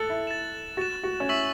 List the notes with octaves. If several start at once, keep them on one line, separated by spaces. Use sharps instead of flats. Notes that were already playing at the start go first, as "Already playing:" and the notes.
Already playing: A4 F#6 A6 F#7
E4
A6 E7
F#4 A6 E7
F#4
C#4
E4 C#6 E6 B6 F#7